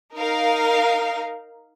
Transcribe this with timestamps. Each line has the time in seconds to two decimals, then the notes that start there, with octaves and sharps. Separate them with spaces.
0.14 D#4 A#4 F5